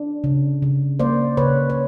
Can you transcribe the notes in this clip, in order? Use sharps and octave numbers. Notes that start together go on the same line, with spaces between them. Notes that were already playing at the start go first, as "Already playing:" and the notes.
Already playing: D4
C#3
C#3
A#3 C5 D5
C#3 B4 C#5
C#5